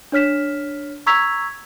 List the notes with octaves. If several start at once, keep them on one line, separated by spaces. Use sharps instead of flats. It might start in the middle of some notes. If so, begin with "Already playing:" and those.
D4 C#5 F6 B6 E7
A#5 C#6 E6 G#6 B6 F7